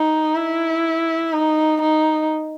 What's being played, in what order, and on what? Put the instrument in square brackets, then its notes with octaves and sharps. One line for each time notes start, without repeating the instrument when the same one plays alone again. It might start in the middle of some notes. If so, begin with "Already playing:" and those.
Already playing: [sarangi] D#4
E4
D#4
D#4